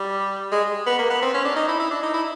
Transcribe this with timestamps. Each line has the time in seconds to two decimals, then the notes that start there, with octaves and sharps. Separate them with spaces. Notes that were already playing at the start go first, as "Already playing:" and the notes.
Already playing: G3
0.52 G#3
0.86 B3
0.99 A#3
1.10 B3
1.22 C4
1.34 C#4
1.45 D4
1.56 D#4
1.68 E4
1.79 E4
1.91 D4
2.03 D#4
2.14 E4